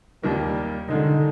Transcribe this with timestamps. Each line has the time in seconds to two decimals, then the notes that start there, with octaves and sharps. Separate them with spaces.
0.23 D#2 D#3 G3 A#3
0.88 D3 D#3 G#3 D#4